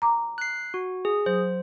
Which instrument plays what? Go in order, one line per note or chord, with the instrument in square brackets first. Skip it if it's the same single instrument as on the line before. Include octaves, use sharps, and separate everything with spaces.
[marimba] A#5 D6
[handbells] F#6 C7
F#4
G#4
[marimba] F#3 [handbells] C5